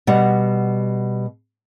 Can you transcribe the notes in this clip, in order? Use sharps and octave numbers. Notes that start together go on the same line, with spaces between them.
B2 G3 F#5